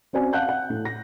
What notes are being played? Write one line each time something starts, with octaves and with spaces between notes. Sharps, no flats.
C4 C#4 F#4 C5 D5 G#5
F5 F#5 A5 F#6 G6
F#5
A2
A#6